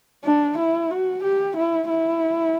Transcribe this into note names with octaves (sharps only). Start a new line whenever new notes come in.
D4
E4
F#4
G4
E4
E4